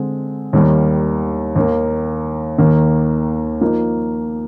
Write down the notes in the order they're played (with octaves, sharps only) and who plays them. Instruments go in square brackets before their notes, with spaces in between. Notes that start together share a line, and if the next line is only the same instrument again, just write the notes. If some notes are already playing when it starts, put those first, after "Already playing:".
Already playing: [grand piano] D3 G#3 C4
D#2 D#3 G3 A#3
D#2 D#3 A#3
D#2 D#3 A#3
F3 A#3 D#4